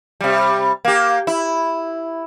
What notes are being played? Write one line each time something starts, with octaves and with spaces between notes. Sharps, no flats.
C3 G3
A#3 G4
E4